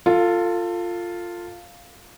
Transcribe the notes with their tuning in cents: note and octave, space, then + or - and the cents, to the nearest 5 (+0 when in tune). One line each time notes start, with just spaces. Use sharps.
F4 +0 A4 +25